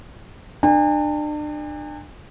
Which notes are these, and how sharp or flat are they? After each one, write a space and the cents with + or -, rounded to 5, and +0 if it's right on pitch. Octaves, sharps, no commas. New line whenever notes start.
D4 +35 G#5 -45